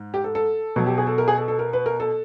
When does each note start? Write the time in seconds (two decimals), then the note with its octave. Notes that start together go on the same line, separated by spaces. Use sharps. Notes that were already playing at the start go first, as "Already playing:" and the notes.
Already playing: G#2
0.14 G4
0.24 A4
0.35 A4
0.76 B2 F#3
0.86 G4
0.98 G#4
1.07 A4
1.18 A#4
1.28 G#4
1.38 A4
1.48 A4
1.59 A#4
1.73 B4
1.86 A#4
2.00 A4